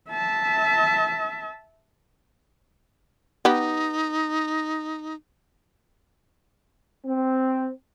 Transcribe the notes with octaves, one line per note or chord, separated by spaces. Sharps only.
E5 A5
B3 D#4 G4
C4